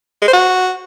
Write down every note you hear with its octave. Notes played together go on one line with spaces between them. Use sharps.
G#3
C5
F#4